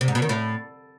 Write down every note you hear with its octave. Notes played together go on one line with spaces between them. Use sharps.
C3
G#2
B2
D#3
A2